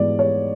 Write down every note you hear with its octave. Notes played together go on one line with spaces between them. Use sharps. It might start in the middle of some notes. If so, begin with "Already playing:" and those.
Already playing: G#2 E3 G#3 B3 D5
C#5